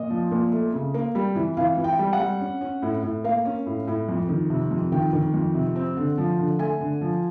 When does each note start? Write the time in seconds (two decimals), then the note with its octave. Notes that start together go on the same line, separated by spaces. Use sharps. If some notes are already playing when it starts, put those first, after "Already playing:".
Already playing: A#2 D#5
0.10 F3
0.31 A#2
0.52 A3
0.73 C#3
0.94 A#3
1.15 G3
1.35 E3
1.57 E3 F5
1.77 E3
1.84 G5
1.99 G3
2.13 F#5
2.20 G3
2.40 C#4
2.61 C#4
2.82 A2
3.03 A2
3.24 A#3 F5
3.45 C#4
3.66 A2
3.87 A2
4.09 F2
4.29 D#3
4.50 C3
4.71 F2
4.92 D#3 G5
5.13 D#3
5.34 F2
5.55 C3
5.76 C4
5.97 D3
6.17 F3
6.38 D3
6.59 A3 G#5
6.80 D3
7.01 F3